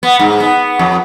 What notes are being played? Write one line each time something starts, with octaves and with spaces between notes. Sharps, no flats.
B3
G#2
B3
F2